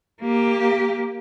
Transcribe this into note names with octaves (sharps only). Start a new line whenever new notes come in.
A#3 G4